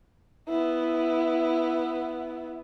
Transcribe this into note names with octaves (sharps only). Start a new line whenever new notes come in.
B3 E4